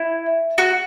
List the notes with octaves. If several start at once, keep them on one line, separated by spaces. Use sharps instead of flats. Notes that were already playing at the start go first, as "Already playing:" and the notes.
Already playing: E4
F#4